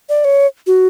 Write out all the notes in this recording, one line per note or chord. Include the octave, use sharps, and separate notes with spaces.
D5
C#5
F#4